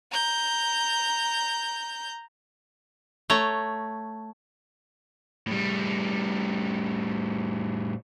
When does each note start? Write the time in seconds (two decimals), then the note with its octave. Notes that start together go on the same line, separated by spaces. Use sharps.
0.12 A#5 G6
3.30 A3 C#5 A#5
5.48 A2 G3